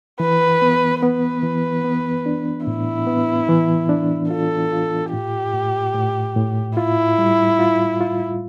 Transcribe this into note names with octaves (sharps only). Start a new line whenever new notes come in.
E3 B4
B3
B3 B4
E3
B3
D4
A2 E4
B3
E3
D4
F4 A4
F4
A2 G4
A2
A2
A2
E4 F4
G3
F4
F4